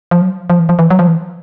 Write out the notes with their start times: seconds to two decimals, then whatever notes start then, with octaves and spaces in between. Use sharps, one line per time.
0.11 F3
0.22 F#3
0.50 F3
0.60 E3
0.69 F3
0.79 E3
0.90 F#3
0.99 F3
1.08 E3